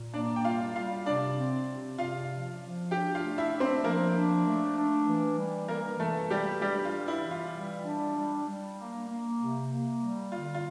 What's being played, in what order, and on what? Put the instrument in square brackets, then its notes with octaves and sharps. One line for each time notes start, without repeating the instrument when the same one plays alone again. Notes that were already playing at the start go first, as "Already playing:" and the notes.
Already playing: [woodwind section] A#2
[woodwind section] A#3 [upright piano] D4 D5
[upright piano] G5
[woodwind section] G3 [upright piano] F4 F5
[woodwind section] G3 [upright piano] F4 F5
[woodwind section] C3 [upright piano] D4 D5
[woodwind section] C4
C3
[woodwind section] C3 [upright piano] F4 F5
[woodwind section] F3
F3
[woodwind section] D4 [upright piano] G4 G5
[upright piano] F4 F5
[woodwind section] A3
[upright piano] E4 E5
[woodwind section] D4
[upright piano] C4 C5
[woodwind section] F3 [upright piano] A#3 A#4
[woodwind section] D4
A3
D4
E3
G3
[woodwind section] E3 [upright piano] A#3 A#4
[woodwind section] E3 [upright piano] A3 A4
[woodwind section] E3 [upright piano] G3 G4
[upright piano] G3 G4 [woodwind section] D4
[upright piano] F4
[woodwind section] E3
[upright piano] E4
[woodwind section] E3
[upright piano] F4
[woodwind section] G3
D4
G3
G3
A#3
A#3
C3
A#3
G3
[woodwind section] D3 [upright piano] F4
[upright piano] F4